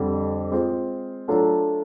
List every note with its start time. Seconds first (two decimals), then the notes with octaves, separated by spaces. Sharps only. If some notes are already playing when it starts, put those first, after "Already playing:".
Already playing: F2 D3 G3
0.52 G#3 C4 F4
1.28 F#3 A3 D4 F4 A4